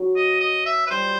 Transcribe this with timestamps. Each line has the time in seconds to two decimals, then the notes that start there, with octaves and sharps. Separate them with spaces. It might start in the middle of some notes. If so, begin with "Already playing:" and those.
Already playing: F#3
0.16 D#5
0.41 D#5
0.66 E5
0.87 B4
0.91 G3 C5